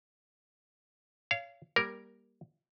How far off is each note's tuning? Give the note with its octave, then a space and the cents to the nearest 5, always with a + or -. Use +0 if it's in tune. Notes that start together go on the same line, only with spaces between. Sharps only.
C#5 +25 F5 -20
G3 +0 A#3 +20 A#4 +0